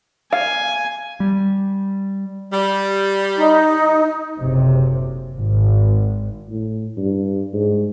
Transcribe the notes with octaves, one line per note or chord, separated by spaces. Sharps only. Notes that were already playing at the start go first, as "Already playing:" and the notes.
F5 G#5
G3
G3
D#4
F#1 C3
G#1
A2
G2
G#2